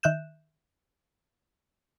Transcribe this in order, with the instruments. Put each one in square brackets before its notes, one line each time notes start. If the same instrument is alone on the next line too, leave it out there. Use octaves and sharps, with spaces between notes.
[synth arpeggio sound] D#3 E5 F#6 G6 E7